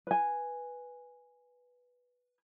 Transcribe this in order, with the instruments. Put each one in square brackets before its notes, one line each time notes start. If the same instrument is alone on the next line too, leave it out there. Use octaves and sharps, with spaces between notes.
[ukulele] B4 G#5